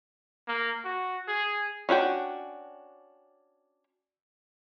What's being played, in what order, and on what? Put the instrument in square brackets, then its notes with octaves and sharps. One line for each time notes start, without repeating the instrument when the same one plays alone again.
[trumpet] A#3
F#4
G#4
[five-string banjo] C#4 D4 F#4 G5